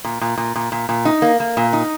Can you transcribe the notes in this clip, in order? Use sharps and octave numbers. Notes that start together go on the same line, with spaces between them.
A#2
A#2
A#2
A#2
A#2
A#2
D#4
A#3
A#3
A#2
D#4